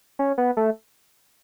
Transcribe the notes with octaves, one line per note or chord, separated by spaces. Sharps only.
C#4
B3
A3